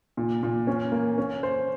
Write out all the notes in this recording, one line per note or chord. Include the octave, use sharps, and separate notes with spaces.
A#2
A#2
C#4
A#3
C#4
C5